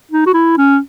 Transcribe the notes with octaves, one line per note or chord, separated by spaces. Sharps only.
D#4
F#4
E4
C#4